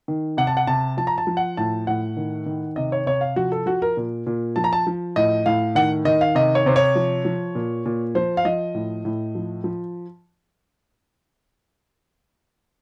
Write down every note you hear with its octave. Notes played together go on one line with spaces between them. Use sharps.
D#3
C3 F#5
A5
F#5
C3 A5
F3 A5
A#5
A5
F3
F#5
A2 A5
A2 F#5
D#3
D#3
C3 D#5
C#5
C3 C#5
F5
F3 F#4
A4
F3 F#4
A#4
A#2
A#2
F3 A5
A#5
A5
F3
A2 D#5
A2 F5
D#3 F#5
D#3 D#5
F5
C3 D#5
C#5
C3 C5
C#5
F3
F3
A#2
A#2
F3 C5
F5
F3 D#5
A2
A2
F3
F3